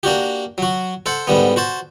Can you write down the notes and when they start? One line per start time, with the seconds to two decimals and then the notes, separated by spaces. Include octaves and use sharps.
0.03 A#3 D4 F#4 G4
0.58 F#3 F#4
1.06 A4 C5 F#5
1.27 G#2 D3 G3 B3
1.56 F#4 C5 A5